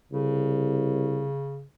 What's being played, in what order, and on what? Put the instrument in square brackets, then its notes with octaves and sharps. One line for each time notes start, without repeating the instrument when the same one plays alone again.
[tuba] C2 [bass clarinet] C#3